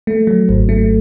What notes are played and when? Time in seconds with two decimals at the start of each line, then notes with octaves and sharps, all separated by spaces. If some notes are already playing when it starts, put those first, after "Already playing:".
0.07 A3
0.27 F#3
0.49 G#1
0.69 A3